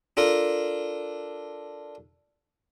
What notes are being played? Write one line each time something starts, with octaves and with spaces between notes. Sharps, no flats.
D4 F4 A4 A#4